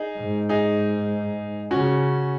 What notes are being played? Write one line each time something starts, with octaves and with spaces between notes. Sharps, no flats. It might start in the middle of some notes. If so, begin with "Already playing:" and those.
Already playing: D#4 G#4
G#2
D#4 G#4
C#3 C#4 F#4